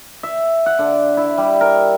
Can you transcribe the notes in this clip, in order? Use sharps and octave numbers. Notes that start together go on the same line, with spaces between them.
E5
F#5
D3
E4
G3
A#4